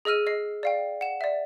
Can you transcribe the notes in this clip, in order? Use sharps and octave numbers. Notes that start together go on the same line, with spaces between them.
G#4 D#5 E6 F6 D#7
D#5 C7
D5 F5 G5
F#5 E7
D5 E5